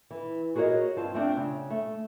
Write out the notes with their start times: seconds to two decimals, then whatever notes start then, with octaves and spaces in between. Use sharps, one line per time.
0.11 E3
0.55 F#4 G#4 A#4 C5 C#5 D#5
0.96 G2 C4 F4 A5
1.14 A3 C4 D4 F4
1.37 C#3
1.70 A3